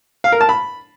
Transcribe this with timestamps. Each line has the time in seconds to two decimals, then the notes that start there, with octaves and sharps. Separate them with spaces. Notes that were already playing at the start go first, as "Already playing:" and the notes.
0.24 F5
0.32 A#4
0.41 A5
0.49 B5